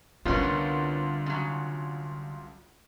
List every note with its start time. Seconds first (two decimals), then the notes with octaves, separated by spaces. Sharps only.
0.25 C2 D3 B3 C#4 D4 F4 A#4
1.26 C#3 F#3